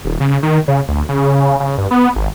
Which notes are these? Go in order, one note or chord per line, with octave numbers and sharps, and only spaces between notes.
D#1
C#3
D#3
C#3
D2
C#3
C#3
G2
B3
G#1